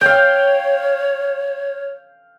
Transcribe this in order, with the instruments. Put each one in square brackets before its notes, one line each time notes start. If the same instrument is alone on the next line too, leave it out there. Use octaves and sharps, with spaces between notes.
[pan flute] C#5 [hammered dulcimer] F5 G5